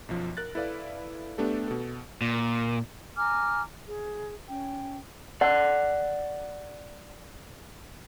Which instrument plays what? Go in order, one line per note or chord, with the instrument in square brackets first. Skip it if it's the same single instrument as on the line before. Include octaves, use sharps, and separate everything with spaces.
[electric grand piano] B1 F#2 F3
A#4 F#6 A6
E4 A4 B4 D5 F5
A3 B3 D4 G4 A4
B2 A4
[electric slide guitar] A#2
[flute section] G#5 A#5 D6 F6
G#4
C#4 G5
[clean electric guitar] D5 F#5